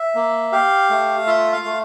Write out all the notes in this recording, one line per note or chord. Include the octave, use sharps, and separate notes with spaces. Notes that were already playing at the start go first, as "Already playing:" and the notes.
Already playing: E5
A#3
G4 F5
A3
F4 E5
F5
A3